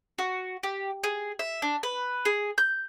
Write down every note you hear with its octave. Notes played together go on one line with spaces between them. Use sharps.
F#4
G4
G#4
E5
D4
B4
G#4
G6